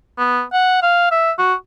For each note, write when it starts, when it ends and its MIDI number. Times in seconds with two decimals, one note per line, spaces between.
0.18 0.42 59
0.53 0.80 78
0.83 1.10 77
1.11 1.32 76
1.39 1.54 66